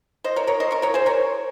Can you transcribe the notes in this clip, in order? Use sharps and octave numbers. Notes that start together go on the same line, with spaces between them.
C5 D#5
A#4 C#5
A#4 C#5
C5 D#5
A#4 C#5
A#4 C#5
G#4 C5
A#4 C#5